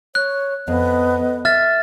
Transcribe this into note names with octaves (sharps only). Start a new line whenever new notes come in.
C#5 F#6
F2 B3 D#5
E5 F6 A6